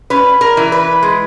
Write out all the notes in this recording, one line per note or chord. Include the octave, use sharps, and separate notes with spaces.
C#4 B4
A#4
E3
B4
G#3